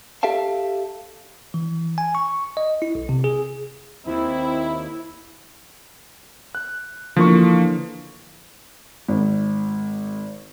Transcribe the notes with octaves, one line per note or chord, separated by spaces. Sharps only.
G4 A4 E5 F5 A5
E3
G#5
C#6
D#5
E4
B1
C3
G#4
D#2 C4 E4
F#6
D3 E3 F3 A#3 C#6
G#1